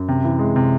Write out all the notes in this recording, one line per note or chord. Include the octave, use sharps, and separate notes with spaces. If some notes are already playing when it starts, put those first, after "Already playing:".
Already playing: F#2
C3
E3
G#3
C3